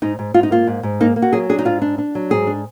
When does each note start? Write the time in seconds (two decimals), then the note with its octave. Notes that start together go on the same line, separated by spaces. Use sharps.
0.02 G#2 D#4
0.19 G#2
0.34 G#2 F4
0.43 D#4
0.51 A#3 F4
0.67 G#2
0.83 G#2
1.00 A#3 D#4
1.16 A#3
1.22 F#4
1.33 F#3 G#4
1.49 D4 G#4
1.59 D#4
1.65 G#2 F4
1.82 D4
1.98 D4
2.15 F#3
2.30 G#2 G#4
2.47 D4